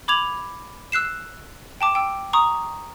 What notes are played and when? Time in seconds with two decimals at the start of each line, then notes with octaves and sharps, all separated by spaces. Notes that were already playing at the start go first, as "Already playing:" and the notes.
0.08 B5 D6 G#6 F7 F#7
0.92 E6 F#6 C7 E7
1.81 G5 A5 D6
1.95 G5 E6
2.33 A#5 C#6 D#6